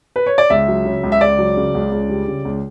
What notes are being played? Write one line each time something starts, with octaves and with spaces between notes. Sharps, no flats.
B4
C#5
D5
C#2 E5
F#3
C#3
C#2
E5
C#2 D5
F#3
C#3
C#2
C#2
G3
C#3
C#2